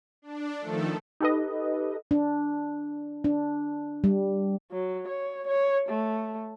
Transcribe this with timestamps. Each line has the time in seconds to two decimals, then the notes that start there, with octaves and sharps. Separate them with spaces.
0.22 D4
0.60 D#3 F3 A3 A4
1.21 D#4 G4 A4 B4 D#5
2.11 D4
3.24 D4
4.04 G3
4.71 F#3
5.08 C#5
5.47 C#5
5.89 A3